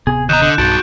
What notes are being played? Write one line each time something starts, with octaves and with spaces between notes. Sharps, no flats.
D1 C3 B3 G#4
D#2 D#5 A#5 F#6 G6 E7
D3
B1 G2 D#4 F#4 A5 G6 D7